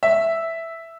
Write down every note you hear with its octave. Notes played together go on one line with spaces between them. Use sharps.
E5